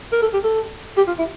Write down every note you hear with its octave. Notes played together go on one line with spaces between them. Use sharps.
A#4
A4
G4
A4
G4
F4
E4